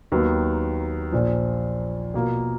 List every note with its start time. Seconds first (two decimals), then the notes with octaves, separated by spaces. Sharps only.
0.12 D#2 D#3 F#3 B3
1.12 A#1 A#2 F3
2.14 B2 A#3 F4